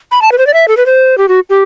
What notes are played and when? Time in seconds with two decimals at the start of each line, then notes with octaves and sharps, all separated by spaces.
0.11 B5
0.22 A5
0.32 B4
0.38 C5
0.47 D5
0.54 E5
0.68 A4
0.77 B4
0.86 C5
1.18 G4
1.28 F#4
1.50 G4